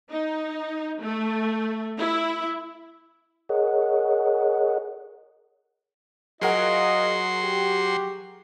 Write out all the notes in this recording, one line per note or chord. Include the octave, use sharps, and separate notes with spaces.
D#4
A3
E4
G#4 A#4 C#5 D#5 F#5
F#3 F4 G#4 A#4 D#5 F#5 C6
G4